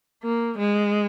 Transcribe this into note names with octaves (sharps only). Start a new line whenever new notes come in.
A#3
G#3